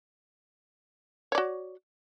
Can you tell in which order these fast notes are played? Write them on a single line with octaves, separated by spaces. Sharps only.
C#5 D5 F#4